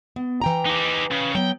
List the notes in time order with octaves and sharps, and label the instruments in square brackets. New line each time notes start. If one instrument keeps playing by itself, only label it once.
[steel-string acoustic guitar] B3
E3 G5 A#5
[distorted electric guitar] D#4 G4
C#3
[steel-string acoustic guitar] F#3 B3 [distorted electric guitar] G5